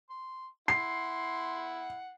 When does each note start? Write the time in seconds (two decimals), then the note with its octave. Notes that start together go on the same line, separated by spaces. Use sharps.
0.10 C6
0.68 E4 F#5 C6 C7